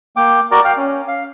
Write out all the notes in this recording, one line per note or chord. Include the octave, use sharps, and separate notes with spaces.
A#3 G5 D6
F#4 A#4 D5 A#5 D6
F5 G5 F6
C#4
F5